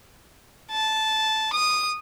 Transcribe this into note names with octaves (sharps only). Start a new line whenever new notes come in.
A5
D#6